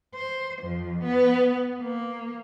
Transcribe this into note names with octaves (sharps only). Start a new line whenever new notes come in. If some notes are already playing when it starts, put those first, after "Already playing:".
C5
F2
B3 B4
A#3